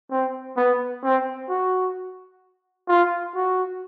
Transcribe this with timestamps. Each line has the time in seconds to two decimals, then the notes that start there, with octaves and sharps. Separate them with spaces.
0.11 C4
0.57 B3
1.03 C4
1.49 F#4
2.88 F4
3.35 F#4